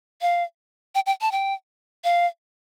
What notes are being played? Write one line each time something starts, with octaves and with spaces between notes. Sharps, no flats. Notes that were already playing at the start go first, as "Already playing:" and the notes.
F5
G5
G5
A5
G5
F5